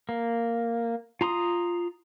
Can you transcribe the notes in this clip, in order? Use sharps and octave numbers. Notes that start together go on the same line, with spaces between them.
A#3
F4 A#5 C6 D#6